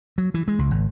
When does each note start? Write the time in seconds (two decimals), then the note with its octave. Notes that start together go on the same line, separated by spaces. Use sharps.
0.18 F#3
0.34 E3
0.48 G#3
0.59 C#2
0.71 G#1